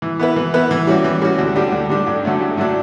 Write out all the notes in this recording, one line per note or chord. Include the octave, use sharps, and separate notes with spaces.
E3
B3 E4 B4
E3
B3 E4 B4
E3
G3 C#4 F#4
E3
G3 C#4 F#4
D2
D3 G3 D4 G4
D2
D3 G3 D4 G4
G2
D3 F#3 A3 D4
G2
D3 F#3 A3 D4